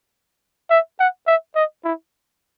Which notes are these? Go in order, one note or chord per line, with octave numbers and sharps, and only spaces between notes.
E5
F#5
E5
D#5
E4